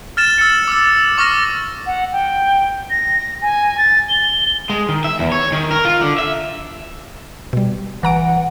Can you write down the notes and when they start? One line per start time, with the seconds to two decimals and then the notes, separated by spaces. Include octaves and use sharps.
0.17 F6 A6 E7
0.38 E6 F6 A6 C#7
0.68 D6 E6
1.18 C#6 D6 F6 A#6
1.86 F#5
2.13 G5
2.90 A#6
3.42 G#5
3.78 A6
4.09 G7
4.70 G#3
4.89 D#3
5.04 E5
5.19 E2
5.32 C#5
5.52 D#3
5.71 A#4
5.85 F4
6.01 D3
6.18 E5
7.53 B2 G3
8.03 G1 E3 F#5 A#5 D7